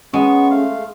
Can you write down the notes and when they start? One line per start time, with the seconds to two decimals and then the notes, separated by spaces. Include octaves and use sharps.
0.14 G#3 B3 C#4 C#6
0.50 A3 F5